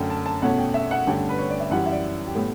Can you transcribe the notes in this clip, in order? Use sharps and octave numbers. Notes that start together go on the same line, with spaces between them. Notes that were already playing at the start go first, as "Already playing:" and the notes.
Already playing: F#2 D3 A3 D5 G5
A5
A5
E2 B2 A3 C#4 F#5
G5
E5
F#5
G2 D3 A3 C#4 G5
B4
C#5
D5
E5
F#2 E3 G3 F#5
E5
D5
G4
A2 G3 B3 A4